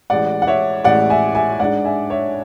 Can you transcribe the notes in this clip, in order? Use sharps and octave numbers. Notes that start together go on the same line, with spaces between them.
A1 A2 G#3 D5 F#5
F#5
C#5 E5
A1 A2 G#3 D5 F#5
E5 G#5
E5 G#5
G#2 G#3 D4 D5 F#5
E5 G#5
C#5 E5